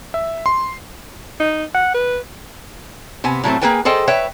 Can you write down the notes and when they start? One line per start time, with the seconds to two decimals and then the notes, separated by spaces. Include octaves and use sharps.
0.14 E5
0.46 C6
1.40 D#4
1.74 F#5
1.95 B4
3.24 C3 B3 G#5
3.44 A2 F#3 A3 C4
3.61 A#3 E4 G#4 B4 G5 G#5
3.85 G#4 A4 C5 D#5 G5
4.08 B4 C#5 E5 G5